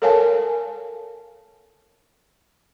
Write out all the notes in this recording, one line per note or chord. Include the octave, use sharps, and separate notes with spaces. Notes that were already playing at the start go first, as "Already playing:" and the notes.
A4 A#4 C#5 F5 G#5 A5